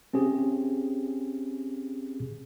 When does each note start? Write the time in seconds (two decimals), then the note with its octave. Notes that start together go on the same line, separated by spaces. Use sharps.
0.13 C4 C#4 G4 G#4